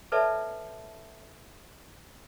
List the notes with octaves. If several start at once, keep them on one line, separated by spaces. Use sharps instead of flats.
A4 B4 C#5 D5 E5 A5